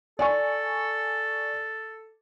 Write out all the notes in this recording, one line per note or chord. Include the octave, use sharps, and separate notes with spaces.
A4 D5 G#5 C#6